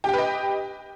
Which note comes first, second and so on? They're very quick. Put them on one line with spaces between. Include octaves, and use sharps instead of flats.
G4 G5 B4 D#5